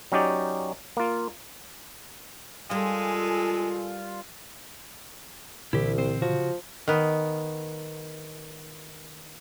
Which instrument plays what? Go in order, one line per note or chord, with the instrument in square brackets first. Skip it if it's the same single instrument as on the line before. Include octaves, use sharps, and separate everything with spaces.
[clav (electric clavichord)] F#3 C#4 D#4 G4 D5
A#3 F4
[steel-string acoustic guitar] G3 A#4 [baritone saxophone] G#3 [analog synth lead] F4 [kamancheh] A4 G#5
[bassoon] C2 [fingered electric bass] A#2 D3 E3 [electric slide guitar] E4 G4
[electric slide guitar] C4 C5
[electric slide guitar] C#3 F#4 [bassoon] F3
[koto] D#3 B3